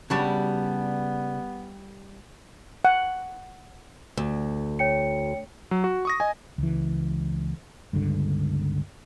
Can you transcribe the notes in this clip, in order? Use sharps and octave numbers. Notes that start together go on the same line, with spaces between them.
C#3 G3 B3 D4 E4 F#4
F#5
D2
C#5 G5 C#7
F#3
F#4
C#6 D#6 A#6
D#5 G#5
C#2 E3
G1 C#2 G2 D3